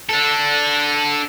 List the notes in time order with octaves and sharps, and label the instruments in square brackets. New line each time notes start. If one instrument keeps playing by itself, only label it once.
[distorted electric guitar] D4 A4